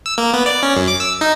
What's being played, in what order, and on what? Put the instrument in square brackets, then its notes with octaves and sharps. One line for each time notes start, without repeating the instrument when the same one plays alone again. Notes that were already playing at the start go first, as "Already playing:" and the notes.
[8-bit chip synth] E6
A#3
B3
D5
C#4
F#2
D6
E6
D#4